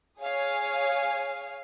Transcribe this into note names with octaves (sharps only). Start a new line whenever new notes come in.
G#4 C#5 F5 G#5